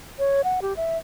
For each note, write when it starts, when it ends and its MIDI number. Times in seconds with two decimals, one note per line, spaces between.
0.19 0.42 73
0.44 0.60 78
0.62 0.76 67
0.77 0.97 76